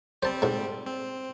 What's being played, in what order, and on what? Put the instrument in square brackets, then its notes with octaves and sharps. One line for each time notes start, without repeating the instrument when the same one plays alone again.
[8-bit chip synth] G3 C4 [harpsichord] C5 A5
[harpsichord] G#2 A3
[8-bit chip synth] C4